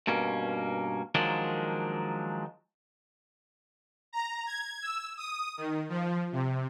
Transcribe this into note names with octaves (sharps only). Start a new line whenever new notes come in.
G2 B2 A#3 C#4
D#3 F3 F#3 G#3 A#3 D4
A#5
G#6
E6
D#6
D#3
F3
C3